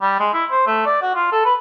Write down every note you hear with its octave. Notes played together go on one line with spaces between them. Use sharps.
G3
G#3
E4
C5
A3
D5
F#4
F4
A4
B4